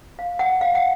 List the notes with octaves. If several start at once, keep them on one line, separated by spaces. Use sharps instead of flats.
F5
F#5
F5
F#5